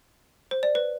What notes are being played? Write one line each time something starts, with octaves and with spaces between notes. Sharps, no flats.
C5
D5
B4